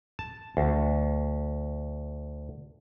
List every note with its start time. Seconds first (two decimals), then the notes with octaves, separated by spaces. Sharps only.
0.19 A5
0.57 D2